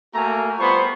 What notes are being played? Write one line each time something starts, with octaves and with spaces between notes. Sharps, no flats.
A3 A#3 F#4 G#5 A#5
G3 B3 F4 C5 B5 C#6